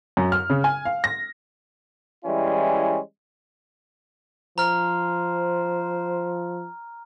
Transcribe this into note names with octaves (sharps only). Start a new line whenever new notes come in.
F#2
F6
C#3
G#5
F5
A#6
E3 G3 G#3 C#4 E4
F3 C5 A#5 F6